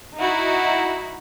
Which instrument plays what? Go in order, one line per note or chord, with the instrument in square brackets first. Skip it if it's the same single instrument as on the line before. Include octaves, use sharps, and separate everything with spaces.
[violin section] D#4 E4 F#4